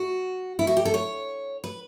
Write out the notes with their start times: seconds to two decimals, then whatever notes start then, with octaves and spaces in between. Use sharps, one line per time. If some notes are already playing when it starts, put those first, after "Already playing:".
Already playing: F#4
0.59 E4
0.67 F#4
0.77 G4
0.85 A4
0.94 C#5
1.64 B4